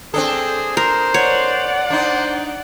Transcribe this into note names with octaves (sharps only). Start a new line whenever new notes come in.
C4 D4 G#4 A4
A#4 C5
C#5 D5 F#5
D4 D#4 C5